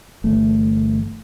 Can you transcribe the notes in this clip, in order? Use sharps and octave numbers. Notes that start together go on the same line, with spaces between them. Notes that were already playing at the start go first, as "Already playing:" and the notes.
G1 E3 A3